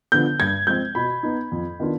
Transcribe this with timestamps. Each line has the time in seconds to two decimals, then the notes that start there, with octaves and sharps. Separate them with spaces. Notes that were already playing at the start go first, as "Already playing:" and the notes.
0.12 D3 F3 B3 G6
0.40 G2 G#6
0.67 F3 G#3 C4 G6
0.95 B2 B5
1.23 B3 D#4
1.52 F2
1.80 D#3 B3 D4 F4